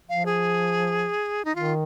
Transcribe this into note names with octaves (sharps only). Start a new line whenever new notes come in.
F3 F5
G#4
D#4
D#3 F4